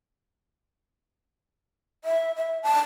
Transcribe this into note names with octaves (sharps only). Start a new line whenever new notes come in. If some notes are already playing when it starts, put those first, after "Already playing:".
E5
E5
A5